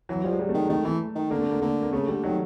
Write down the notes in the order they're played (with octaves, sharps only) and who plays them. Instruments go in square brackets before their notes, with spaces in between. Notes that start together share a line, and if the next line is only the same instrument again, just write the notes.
[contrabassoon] E3 [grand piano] F#3
[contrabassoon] F3 [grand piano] G3
[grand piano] G#3
G3
A3
[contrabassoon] D#3
[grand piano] G#3
[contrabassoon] D#3 [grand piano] A3
[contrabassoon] E3 [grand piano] A3
[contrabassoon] D#3
[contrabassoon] D3 [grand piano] A#3
[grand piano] A3
A#3
[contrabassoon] D3 [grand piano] A#3
[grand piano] A#3
[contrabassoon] C#3 [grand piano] A3
[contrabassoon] D3 [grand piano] G3
[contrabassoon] D#3 [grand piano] F#3